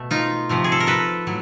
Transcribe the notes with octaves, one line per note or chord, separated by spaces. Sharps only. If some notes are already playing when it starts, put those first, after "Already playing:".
Already playing: B2 A3
D#4 F4
C3 F3 A3
G#4
A4
A#4
A4 B4
A2 F#3